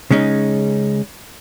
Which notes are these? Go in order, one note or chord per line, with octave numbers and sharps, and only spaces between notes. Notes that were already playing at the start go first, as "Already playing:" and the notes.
C#3 G#3 C#4 D#4